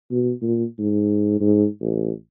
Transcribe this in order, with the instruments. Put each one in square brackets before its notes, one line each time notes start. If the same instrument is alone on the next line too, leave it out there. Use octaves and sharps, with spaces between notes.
[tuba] B2
A#2
G#2
G#2
A1